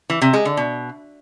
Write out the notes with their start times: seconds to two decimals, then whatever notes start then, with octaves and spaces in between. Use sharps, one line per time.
0.10 E3
0.21 C3
0.33 G#3
0.45 D3
0.57 B2